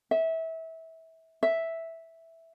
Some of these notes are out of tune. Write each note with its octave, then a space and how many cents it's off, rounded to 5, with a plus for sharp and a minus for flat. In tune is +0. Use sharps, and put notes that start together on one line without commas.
E5 -25
E5 -5